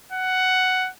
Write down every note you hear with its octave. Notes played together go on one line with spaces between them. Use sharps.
F#5